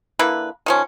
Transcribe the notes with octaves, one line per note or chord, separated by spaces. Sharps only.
D3 A#3 E4 B4
D#3 F3 C#4